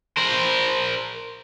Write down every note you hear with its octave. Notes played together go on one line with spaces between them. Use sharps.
A#4 C5